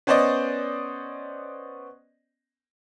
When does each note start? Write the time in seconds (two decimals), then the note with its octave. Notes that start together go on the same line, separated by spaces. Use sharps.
0.07 B3 C#4 C5 D5 D#5